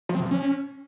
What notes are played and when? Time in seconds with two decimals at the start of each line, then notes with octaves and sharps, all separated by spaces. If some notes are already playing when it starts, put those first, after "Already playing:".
0.09 F3
0.15 C4
0.20 C3
0.26 F3
0.31 C#4